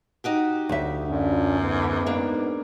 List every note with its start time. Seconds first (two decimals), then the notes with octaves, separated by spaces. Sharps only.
0.24 D#4 F#4 G4
0.69 D2 E5
1.08 F#2 C#4 D4 F4
1.61 G#2 B3
2.06 A#3 D4